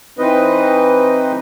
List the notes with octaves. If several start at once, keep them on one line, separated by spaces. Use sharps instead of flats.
E3 C4 D#4 B4 D#5